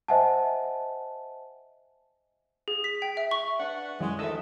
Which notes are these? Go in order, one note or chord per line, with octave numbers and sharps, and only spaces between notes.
C5 D#5 E5 F#5 G#5 A5
G#4
B6
G5
E5
C#6
D4 B4 F#5
F#2 E3 F#3 G#3
D2 D#3 E3 A4 D#5 E5